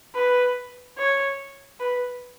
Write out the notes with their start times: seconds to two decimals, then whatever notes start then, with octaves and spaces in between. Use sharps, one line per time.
0.15 B4
0.98 C#5
1.80 B4